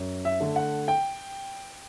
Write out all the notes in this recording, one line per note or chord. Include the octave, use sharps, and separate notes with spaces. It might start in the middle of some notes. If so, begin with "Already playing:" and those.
Already playing: F#2
E5
D3 A3
F#5
G5